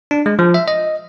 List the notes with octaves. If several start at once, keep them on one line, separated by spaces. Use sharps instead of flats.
D4
G#3
F3
E5
D#5